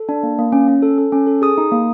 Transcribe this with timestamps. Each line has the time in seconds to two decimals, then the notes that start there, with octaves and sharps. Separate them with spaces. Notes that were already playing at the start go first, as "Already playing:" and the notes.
Already playing: A4
0.09 D4
0.23 A#3
0.39 A#3
0.52 C#4
0.68 C#4
0.82 A4
0.98 A4
1.12 C#4
1.27 A4
1.42 G#4 D#6
1.58 D#4
1.72 A#3